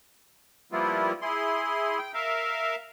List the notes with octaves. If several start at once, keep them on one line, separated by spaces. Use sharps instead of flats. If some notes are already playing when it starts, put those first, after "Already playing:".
F3 G3 A#3 B3 E4 F4
E4 G#4 C6
G5
A#4 E5 F5